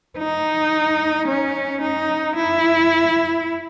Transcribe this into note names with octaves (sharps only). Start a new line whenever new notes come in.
D#4
C#4
D#4
E4